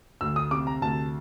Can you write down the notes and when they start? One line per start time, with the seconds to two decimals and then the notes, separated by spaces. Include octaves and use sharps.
0.21 D2 E6
0.36 D#6
0.51 C3 D6
0.67 A#5
0.82 D2 A5